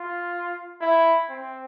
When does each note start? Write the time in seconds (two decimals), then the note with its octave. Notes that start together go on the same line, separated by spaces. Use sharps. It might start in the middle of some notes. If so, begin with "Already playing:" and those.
Already playing: F4
0.81 E4
1.29 C4